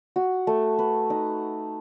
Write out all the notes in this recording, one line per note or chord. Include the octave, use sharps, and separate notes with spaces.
F#4
A3
B4
D#4